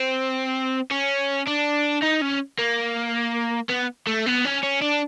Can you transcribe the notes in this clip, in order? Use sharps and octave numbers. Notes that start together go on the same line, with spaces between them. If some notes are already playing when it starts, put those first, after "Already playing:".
Already playing: C4
C#4
D4
D#4
C#4
A#3
B3
A3
B3
C#4
C#4
D4